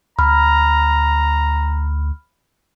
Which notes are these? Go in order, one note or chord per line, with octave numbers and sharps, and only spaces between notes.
D2 A#5 B5 F6